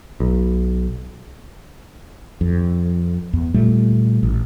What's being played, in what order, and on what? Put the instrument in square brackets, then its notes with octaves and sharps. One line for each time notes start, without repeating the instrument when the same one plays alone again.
[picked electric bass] B1
[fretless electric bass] F2
E2
A#2 G3 A3
A1